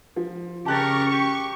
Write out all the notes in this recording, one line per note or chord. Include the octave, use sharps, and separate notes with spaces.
F3
C#3 G4 A#4 A5 C#6 F#6 A6
G4